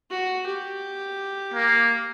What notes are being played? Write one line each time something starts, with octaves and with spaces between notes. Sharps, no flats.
F#4
G4
A#3